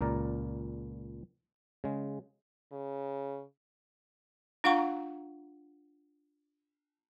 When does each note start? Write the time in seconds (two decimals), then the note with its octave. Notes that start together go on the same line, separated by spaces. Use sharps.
0.01 C#2 A#2 A#4 D5 A#5
1.84 C#3 G#3
2.72 C#3
4.64 D4 F4 F5 F#5 A#5 C#6